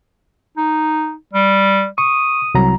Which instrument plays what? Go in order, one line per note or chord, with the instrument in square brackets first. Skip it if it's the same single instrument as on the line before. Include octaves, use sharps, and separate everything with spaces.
[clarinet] D#4
G3
[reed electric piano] C#6 [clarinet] D#6
[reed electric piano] C2 F#3 A#5